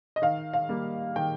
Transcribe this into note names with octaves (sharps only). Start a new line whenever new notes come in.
D#5
D#3 F5
F5
G3 A#3
D#3 G5